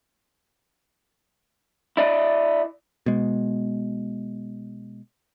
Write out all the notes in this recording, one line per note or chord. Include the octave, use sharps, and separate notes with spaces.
E4 D5 D#5
B2 G#3